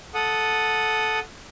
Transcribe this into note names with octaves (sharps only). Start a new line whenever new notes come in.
A4 F#5 D#6